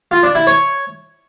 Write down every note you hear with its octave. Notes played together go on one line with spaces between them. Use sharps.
F4
D4
E4
C#5